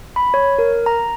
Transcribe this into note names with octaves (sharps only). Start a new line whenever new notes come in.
B5
C#5
A#4
A#5